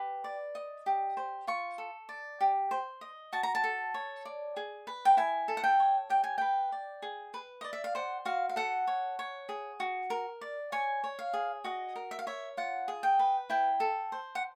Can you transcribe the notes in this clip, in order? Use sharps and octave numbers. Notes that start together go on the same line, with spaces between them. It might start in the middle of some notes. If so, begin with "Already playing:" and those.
Already playing: G4 B4
D5
D#5
G4
C5
F4 C#6
A4
D5
G4
C5
D#5
F#4 A5
A#5
A5
A4
C#5
D5
G#4
B4
G5
E4 G#5
A4
F#5
G5
C#5
G4 G5
G#5
B4 G5
D5
G#4
B4
D5 D#5
E5
F5
C5 F#5
F#4 F5
F5
A4 F#5
C#5
C#5
G#4
F#4
A#4
D5
C#5 G#5
C#5
F5
G#4
F#4 D#5
A#4
E5
F5
C#5 E5
F4 F#5
G#4
G5
B4
E4 G5
A4
C5
F#5